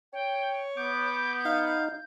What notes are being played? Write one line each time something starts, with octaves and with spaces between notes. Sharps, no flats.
C#5 G5
B3 D6 G6
D#4 F5